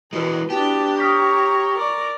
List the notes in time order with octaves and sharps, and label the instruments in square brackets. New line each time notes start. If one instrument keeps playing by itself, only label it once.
[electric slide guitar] E3 G#3 [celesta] E4 F#4 B4 [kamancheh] A#4
[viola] B3 D4 [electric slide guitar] G4 [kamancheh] A5
[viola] C#5 [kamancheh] A#5 C#6 [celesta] D#6 F6 B6
[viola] A#4 D5